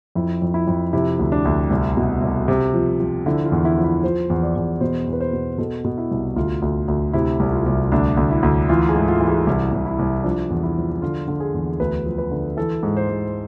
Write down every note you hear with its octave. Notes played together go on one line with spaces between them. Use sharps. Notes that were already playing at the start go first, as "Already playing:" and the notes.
F2 E4
F2
E4
F2
C3 E4
D2
D4
D2
C2
B2
C2
C3
F3
F3
D3 E4
F4
E2
E4
F3
E4
F3 C5
E2
D5
E2
B2 C5
E2
B4
C5
B2
B2 A4
B2
E4
C2
D2 F4
D2
D2
C3 E4
C2
F4
C2
D2 D4
D2
E4
D2
E3 F4
G#4
G#2
F4
E3
G#4
C2
C2
E4
C2
F3 D4
E2
E4
F3
D3 F4
D3
G#4
E2
D2 B4
F3
B4
D3
E3 A4
G#2
C5
G#2